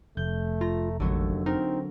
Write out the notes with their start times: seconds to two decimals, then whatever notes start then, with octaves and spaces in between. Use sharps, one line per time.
0.17 F1 A3 G6
0.61 F4 A#5
1.00 A1 D#2 D3 F#3 A3
1.46 C4 D#4 A#4